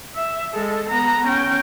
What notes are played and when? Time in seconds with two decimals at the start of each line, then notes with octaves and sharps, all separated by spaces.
0.16 E5
0.54 G#3 A4
0.89 B3 A#5
1.26 C#4 G5